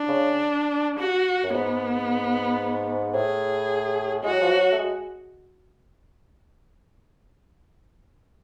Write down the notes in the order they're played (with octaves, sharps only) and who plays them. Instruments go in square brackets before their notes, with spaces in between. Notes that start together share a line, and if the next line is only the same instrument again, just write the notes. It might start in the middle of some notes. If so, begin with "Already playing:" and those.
Already playing: [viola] D4
[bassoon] C#3
[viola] F#4
[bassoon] F#2
[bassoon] G#2 [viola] B3
[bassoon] A2 [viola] G#4
[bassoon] G#3 [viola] F#4
[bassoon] F#3
F3
F#3
A3
G#3